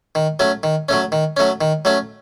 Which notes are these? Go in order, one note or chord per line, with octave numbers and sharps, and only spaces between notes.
D#3
F#3 A3 C#4
D#3
F#3 A3 C#4
D#3
F#3 A3 C#4
D#3
F#3 A3 C#4